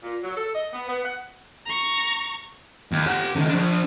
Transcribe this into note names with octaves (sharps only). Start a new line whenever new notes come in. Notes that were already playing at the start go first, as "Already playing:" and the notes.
A#2
F#3
A4
D#5
B3
B3
F#5
A#5 C#6
D#2
G4 F#5
D3 D#3
F3 D4